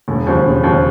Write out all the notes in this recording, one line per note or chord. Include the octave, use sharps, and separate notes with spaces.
E1
D#2 C#3 F3
E1
D#2 C#3 F3